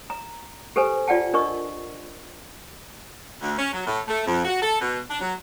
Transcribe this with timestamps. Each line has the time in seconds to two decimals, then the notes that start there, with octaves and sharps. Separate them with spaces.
0.10 A#5
0.76 G4 A4 B4 C5 G#5
1.08 F4 D5 F#5 G5 A5
1.33 D4 A#4 D#5 C#6
3.40 D2
3.56 C#4
3.72 F#3
3.86 A2
4.08 A3
4.26 F2
4.45 F#4
4.61 A4
4.80 B2
5.09 D4
5.20 F#3